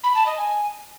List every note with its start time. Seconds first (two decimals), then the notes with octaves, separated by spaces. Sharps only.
0.04 B5
0.15 A5
0.26 D#5
0.38 G#5